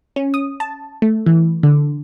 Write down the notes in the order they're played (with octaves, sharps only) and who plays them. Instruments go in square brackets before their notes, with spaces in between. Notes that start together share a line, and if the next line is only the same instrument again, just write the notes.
[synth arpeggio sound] C#4
D#6
A5
A3
E3
D3